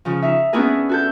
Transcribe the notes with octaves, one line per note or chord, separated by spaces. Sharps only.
C#3 F3
D#4 E5
B3 C#4 D4 E4 G#4 A#4
F#4 A4 G6